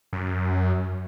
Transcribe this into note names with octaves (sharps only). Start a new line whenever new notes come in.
F#2